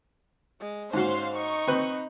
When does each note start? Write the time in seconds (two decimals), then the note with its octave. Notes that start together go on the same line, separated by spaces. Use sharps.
0.60 G#3
0.93 G#2 C#4 F#4 C5 F5 C6
1.35 D#4 C#6
1.68 C4 B4